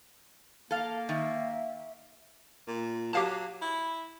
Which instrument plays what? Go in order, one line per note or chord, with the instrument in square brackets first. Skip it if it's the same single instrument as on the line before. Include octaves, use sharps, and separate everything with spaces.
[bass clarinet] A#3 [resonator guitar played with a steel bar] A4 F5
[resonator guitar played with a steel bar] D#3 [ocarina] E5
[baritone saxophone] A#2
[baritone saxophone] F#3 [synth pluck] G4 F5 A5
[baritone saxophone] E4